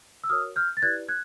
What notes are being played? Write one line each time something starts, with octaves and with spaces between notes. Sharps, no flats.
E6
F#4 A#4 C#5 D#6 F6
F6 G6
A6
E4 G4 B4 D5 F#6 G#6
F#6 G#6